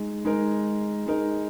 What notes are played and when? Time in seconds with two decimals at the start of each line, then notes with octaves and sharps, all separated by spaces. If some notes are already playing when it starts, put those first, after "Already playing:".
Already playing: G#3 D#4
0.25 G#3 D#4 A#4
1.06 G#3 D#4 A#4